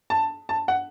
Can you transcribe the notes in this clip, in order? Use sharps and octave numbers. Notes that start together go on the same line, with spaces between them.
A5
A5
F#5